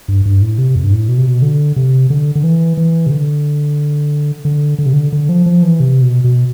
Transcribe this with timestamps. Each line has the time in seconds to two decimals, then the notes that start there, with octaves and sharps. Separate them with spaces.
0.08 G2
0.25 G2
0.42 A2
0.58 C3
0.75 F2
0.84 G2
0.92 A2
1.08 B2
1.18 C3
1.27 B2
1.42 D3
1.76 C3
2.10 D3
2.35 D3
2.44 E3
2.77 E3
3.06 C3
3.11 D3
4.45 D3
4.78 D3
4.86 C3
4.93 D3
5.12 D3
5.29 F3
5.46 F3
5.63 E3
5.80 C3
6.02 B2
6.24 B2